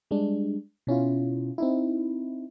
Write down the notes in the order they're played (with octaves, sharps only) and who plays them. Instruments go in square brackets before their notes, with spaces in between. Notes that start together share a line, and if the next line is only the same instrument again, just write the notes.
[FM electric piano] G3 G#3 D4
B2 C#4 E4 F4
C4 D#4 E4